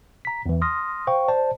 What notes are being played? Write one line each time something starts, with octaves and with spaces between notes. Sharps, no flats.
A#5 B6
E2 E3
C6 D#6 F6 A#6
C5 F5 G5 C#6
C5 D5 A5